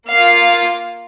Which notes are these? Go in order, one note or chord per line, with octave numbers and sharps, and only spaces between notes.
A#3 F4 F5